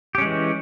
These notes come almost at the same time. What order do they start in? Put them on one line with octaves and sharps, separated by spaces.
G4 C#4 G#3 E3